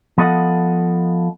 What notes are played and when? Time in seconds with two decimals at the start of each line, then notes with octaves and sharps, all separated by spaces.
0.18 F3 B3 A4 D#5 F#5